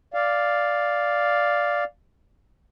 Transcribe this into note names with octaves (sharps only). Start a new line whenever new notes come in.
D5 F5